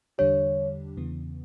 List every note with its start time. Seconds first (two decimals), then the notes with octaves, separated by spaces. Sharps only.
0.18 E2 D3 G3 D4 G4 C#5
0.97 E2 C#3 E3 B3